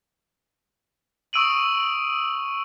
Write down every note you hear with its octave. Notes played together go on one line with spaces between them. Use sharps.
C#6 D#6 E6 D7 D#7 F#7